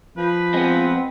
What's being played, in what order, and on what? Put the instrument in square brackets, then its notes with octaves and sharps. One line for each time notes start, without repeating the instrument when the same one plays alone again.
[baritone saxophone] F3 [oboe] B4
[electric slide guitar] G#3 B3 [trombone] C4